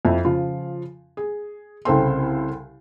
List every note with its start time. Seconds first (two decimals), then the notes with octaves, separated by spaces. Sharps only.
0.05 F2 E4 E5
0.25 C#3 F3 F4
1.17 G#4
1.85 C2 C#3 C4 A4 G5 C6